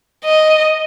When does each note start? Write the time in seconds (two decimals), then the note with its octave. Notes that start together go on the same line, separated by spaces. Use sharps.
0.25 D#5